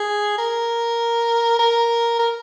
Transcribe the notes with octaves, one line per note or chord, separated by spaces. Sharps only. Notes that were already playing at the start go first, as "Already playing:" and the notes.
Already playing: G#4
A#4
A#4
A#4